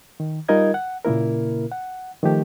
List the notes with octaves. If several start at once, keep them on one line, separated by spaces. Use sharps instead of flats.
D#3
G3 D#4 F4 A#4 D#5 G#6
F#5
A#2 C#3 A#3 E4 A#4
F#5
D#3 F3 A3 G4